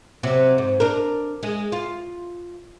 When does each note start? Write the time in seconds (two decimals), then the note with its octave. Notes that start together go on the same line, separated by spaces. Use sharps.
0.23 C3 F#3
0.58 G#2
0.80 D4 A#4
1.43 G#3
1.72 F4